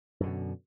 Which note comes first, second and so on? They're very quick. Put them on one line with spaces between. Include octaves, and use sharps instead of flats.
F#2 D3 B2